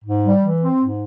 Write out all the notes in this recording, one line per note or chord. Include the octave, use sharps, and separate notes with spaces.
G#2
G3
E3
C4
G#2